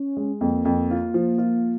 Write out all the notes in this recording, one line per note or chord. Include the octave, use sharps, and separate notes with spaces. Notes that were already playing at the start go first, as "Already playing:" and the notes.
Already playing: C#4
G#3
F2 A#3
F2
F4
F3
F4